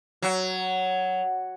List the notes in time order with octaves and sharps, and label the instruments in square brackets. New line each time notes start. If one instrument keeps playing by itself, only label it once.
[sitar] F#3